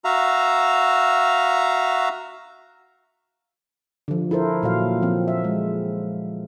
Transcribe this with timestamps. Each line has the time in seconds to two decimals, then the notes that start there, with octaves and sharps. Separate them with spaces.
0.05 F#4 E5 F5 A#5
4.08 D3 F3
4.31 E4 A4 A#4 C5
4.63 A#2 F#3 F5
5.02 F3 C4
5.28 E5
5.44 G#3